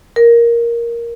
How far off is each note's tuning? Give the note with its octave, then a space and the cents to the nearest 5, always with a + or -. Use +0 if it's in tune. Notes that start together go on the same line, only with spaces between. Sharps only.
A#4 +5